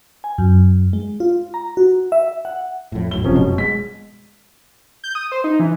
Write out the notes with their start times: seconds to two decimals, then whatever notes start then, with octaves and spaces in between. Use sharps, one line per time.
0.24 G#5
0.38 F#2
0.93 G#3
1.20 F4
1.54 A#5
1.77 F#4
2.12 E5
2.45 F#5
2.92 F2 A2
3.11 B1 F#2 A2 G7
3.24 E1 C3 F3 C#4
3.36 F1 F#2 B2 G#3
3.58 G#3 B6
5.04 G6
5.15 D#6
5.32 C5
5.44 D#4
5.60 E3